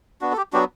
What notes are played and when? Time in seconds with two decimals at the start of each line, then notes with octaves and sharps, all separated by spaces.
0.21 B3 D4 F#4
0.32 A4
0.37 G4
0.53 F#3 B3 D4 F#4 G4